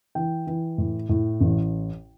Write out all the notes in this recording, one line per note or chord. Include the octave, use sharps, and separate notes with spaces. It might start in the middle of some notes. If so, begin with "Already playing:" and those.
E3 G5
E3
A2
A2
A1